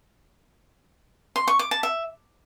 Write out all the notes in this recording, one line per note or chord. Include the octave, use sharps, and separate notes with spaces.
C6
C#6
D6
A5
E5